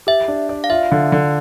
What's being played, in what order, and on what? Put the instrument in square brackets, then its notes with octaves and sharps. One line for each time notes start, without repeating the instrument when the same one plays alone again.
[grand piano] G4 [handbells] E5
[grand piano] D4
D5
[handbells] F5
[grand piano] F4 [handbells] E5
[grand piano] D3
D3